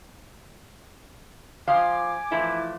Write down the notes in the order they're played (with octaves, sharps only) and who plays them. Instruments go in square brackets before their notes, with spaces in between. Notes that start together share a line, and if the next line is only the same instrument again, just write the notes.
[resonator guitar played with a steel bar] F3 C5 F5 [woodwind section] G#5 D6
[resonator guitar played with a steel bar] E3 F3 A3 [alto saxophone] E4